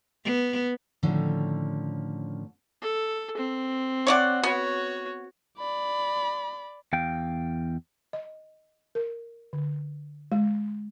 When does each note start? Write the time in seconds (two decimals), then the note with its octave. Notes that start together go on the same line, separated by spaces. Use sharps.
0.24 B3
1.03 A2 D3 D#3 F3 C#4
2.82 A4
3.37 C4
4.07 C#5 D5 F#5
4.44 B3 F#4 C#5
5.58 D5 B5
6.93 E2 F5 G5
8.13 D#5
8.95 A#4
9.53 D3
10.32 G#3